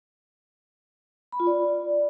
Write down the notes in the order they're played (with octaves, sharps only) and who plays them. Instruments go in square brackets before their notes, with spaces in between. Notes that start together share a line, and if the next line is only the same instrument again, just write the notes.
[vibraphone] B5
F4
D5